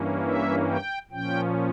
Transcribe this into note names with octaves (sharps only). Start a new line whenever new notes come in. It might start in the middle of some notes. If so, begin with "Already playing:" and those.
Already playing: G2 E3 A#3 C#4
E5
G5
A#2 F3 C#4 G5